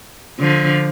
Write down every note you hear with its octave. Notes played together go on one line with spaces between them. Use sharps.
D3 F3